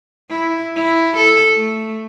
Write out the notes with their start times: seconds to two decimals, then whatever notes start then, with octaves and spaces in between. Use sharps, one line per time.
0.30 E4
0.76 E4
1.16 A4
1.56 A3